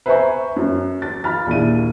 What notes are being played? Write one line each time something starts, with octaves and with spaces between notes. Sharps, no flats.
B4 C5 E5 G#5 A#5 C#6
F#2
A6
F4 B5 F6 A6
A#1 D#2 E4 D#7